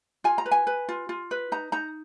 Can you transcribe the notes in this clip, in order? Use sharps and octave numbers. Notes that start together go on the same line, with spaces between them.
F4 G#5
A#5
B4
G#5
B4
F4
F4
B4
D#4 A#5
D#4 A#5